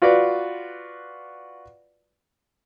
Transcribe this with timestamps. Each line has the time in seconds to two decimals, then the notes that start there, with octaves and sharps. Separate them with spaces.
0.02 F4 F#4 B4 D5